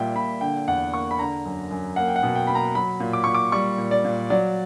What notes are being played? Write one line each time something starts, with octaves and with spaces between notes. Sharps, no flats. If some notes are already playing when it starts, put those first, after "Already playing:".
Already playing: A#2 G3 E5 G5
A#2 B5
D3 G5
E2 F#5
A#3 C#6
B5
D3 A#5
F#2
F#2
A#3 F#5
G5
F#5
B2
G5
A#3 B5
A#5
F#3 B5
A#2
D6
A#2 C#6
D6
G3 C#6
A#2
D5
A#2
F#3 D5